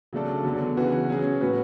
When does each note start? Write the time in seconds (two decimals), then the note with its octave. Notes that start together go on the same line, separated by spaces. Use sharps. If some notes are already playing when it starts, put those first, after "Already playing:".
0.13 C#3 F#3 A3 D4 A4
0.44 E2 D3 F#3
0.77 C#3 E3 B3 F#4
1.09 F#3 C#4 G#4
1.41 A2 F#3 B3 F#4 B4